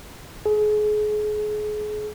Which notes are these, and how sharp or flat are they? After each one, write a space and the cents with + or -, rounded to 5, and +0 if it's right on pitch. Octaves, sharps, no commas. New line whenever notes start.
G#4 +30